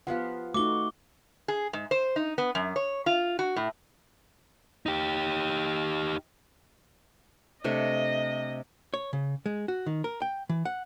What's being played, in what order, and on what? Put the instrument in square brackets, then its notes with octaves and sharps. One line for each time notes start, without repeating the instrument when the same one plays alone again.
[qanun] F3 B3 G4 [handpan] F5 F#5
[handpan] A3 D#4 [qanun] F#4 [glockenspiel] D6 G7
[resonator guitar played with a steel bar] G#4
G#2
C5
D#4
B3
F#2
C#5
F4
F#4
A2
[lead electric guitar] D#4 G4
[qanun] C3 A3 D4 [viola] D#5
[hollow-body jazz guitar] C#5
C#3
G#3
F#4
D#3
A#4
G5
E3
F#5